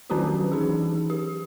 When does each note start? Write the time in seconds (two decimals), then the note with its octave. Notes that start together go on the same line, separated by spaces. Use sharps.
0.10 D#3 F#3 C#4 D4 F#4 G4
0.52 E3 D#4 G#4
1.10 G4